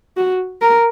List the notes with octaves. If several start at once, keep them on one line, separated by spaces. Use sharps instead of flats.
F#4
A#4